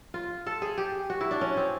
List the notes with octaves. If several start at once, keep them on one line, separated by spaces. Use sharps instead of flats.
F4
A4
G#4
G4
F#4
E4
D4
C#4
C4